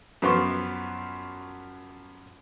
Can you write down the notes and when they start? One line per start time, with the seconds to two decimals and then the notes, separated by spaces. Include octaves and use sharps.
0.22 F#2 F3 B3 C6 C#6